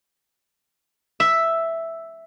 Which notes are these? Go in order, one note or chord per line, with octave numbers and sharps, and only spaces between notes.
E5